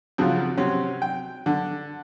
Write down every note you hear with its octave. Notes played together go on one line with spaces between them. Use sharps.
F2 C#3 F3 F#3
C3 F#3 C4 C#4
G5
D3